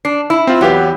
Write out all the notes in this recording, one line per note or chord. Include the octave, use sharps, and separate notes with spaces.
D4 C7
E4 E6
C4 F4
E2 F#3 B3 G4 F5